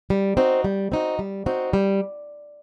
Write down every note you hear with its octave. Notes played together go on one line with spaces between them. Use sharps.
G3
C4 D#4 F#4
G3
C4 D#4 F#4
G3
C4 D#4 F#4
G3